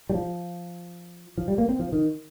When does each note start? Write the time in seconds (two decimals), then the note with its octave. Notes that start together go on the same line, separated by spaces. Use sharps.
0.10 G3
0.14 F3
1.38 F3
1.48 G3
1.58 A#3
1.69 C4
1.79 F3
1.92 D#3